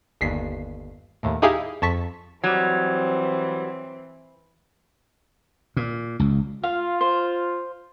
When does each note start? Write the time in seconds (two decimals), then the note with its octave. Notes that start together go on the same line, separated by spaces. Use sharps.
0.21 G1 D#2 B6 C7
1.23 D#2 A2
1.42 D#4 E4 G4 G#4 F5
1.82 F2 A5 C#6 B6
2.44 E3 F#3 G3 C4
5.77 A#2
6.20 C#2
6.64 F4 F5
7.01 C5